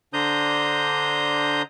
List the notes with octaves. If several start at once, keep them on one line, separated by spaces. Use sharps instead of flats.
D3 D4 C5 A#5 D#6 G6